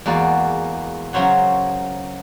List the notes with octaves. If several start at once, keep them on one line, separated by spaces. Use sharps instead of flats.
E2 G#3 A#3 F#4 D5
C#3 F#3 A#4 C5 C#5 F#5